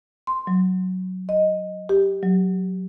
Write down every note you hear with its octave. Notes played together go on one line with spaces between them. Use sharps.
C6
F#3
D#5
G4
F#3